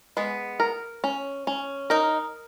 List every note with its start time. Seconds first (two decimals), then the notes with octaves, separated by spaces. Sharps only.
0.17 G#3 B3
0.60 A#4
1.04 C#4
1.47 C#4
1.90 D#4 A#4